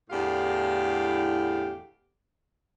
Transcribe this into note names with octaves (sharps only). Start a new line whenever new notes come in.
E2 A2 D3 G4 F5